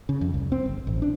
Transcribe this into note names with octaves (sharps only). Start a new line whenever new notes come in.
C#3
F2
C2
C4
G1
A1
D4